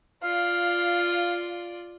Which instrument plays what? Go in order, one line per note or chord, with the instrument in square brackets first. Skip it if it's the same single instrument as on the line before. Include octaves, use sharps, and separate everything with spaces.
[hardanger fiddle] F4 D5 [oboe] F5